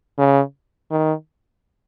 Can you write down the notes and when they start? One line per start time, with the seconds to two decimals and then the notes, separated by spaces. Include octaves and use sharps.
0.19 C#3
0.91 D#3